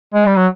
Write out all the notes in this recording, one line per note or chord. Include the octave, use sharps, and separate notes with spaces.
G#3
G3
F#3